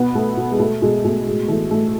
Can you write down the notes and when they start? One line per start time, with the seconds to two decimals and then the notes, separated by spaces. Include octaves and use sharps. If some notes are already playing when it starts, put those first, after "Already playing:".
Already playing: B2 B3
0.15 B2 A3
0.37 B2
0.51 G#3
0.59 B2 A3
0.82 B2 G#3
1.04 B2 A3
1.26 A2 G#3
1.48 E3 A3
1.71 A2 A3